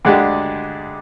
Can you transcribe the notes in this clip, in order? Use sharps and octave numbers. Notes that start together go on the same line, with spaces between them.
D2 D3 G#3 D4 G4